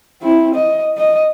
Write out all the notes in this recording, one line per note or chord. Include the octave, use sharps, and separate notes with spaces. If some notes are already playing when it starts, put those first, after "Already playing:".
C4 E4
D#5
D#5